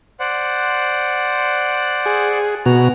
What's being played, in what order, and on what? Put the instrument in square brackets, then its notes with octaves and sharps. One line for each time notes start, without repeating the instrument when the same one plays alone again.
[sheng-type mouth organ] C5 D5 F#5
[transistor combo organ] G#4
[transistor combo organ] B2 F#4 [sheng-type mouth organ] A#5